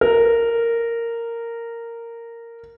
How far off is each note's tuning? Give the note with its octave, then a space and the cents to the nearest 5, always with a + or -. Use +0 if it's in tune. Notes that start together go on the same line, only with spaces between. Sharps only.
A#4 -10